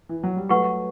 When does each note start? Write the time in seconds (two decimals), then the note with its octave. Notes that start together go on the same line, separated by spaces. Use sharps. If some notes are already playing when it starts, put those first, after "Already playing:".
0.09 E3
0.23 F#3
0.37 G3
0.49 F#3 A3 G4 B4 F#5 C#6